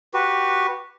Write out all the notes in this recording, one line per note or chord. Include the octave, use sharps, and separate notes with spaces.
F#4 G4 B4